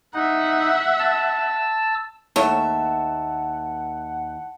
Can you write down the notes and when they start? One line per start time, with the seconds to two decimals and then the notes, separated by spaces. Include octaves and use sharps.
0.14 D#4 E5 F#5
0.99 A5 E6
2.36 D#2 A3 C#5 E5 F#5 A5